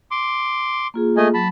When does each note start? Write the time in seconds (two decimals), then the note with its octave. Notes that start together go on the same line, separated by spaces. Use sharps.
0.11 C6 D6
0.94 A#3 F4 G#4
1.17 A3 D#5 G#5
1.34 F#3 A5 B5